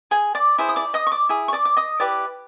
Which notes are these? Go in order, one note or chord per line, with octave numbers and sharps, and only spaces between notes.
G#4 G#5
D5 D6
E4 G#4 C5
D#6
D5 D6
D#5 D#6
C#6
D5 D6
E4 G#4
C#6
D5 D6
D6
D#5 D#6
E4 G4 B4 D5 D6